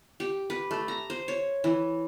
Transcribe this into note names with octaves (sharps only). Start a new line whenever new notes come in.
G4
B4
A3
A#5
C5
C#5
E3